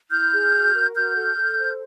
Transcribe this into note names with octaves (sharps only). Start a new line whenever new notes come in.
E4 F6 G6
G#4
F#4
A#4
F#4 F6 G6
A4
A4
C5